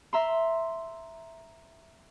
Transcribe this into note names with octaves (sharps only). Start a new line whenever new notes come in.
E5 A#5 C6